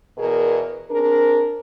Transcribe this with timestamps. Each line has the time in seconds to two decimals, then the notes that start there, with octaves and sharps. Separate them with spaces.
0.18 E2 B2 G#4 A#4
0.90 C4 D4 G#4 A#4